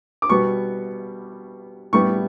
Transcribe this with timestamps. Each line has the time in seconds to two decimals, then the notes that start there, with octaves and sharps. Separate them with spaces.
0.22 D6
0.30 B2 G3 B3 C#6
1.93 A2 G3 B3 C#6